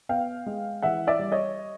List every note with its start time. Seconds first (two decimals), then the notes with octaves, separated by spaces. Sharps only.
0.09 B3 F5 G5
0.46 G#3
0.82 E3 E5 F#5
1.07 D5 E5
1.19 G3
1.32 C#5 D#5